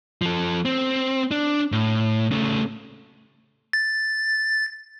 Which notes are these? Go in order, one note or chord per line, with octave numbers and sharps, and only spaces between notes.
F3 A4
C4
D4
A2
C#3 A3
A6